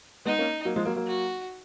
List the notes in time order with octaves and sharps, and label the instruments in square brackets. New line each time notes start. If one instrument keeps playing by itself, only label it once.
[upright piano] G#3 B3 [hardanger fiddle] D#4
[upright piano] A#3 C#4
F#3 A#3
F3 G#3
F#3 A#3
F#3 A#3
[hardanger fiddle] F#4